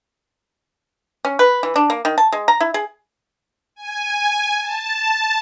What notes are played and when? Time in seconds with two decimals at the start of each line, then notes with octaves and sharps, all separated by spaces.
1.25 C#4
1.39 B4
1.63 E3
1.76 D4
1.90 A#3
2.05 D#3
2.18 A5
2.32 G#3
2.48 A#5
2.60 E4
2.74 G#4
3.75 G#5
4.59 A5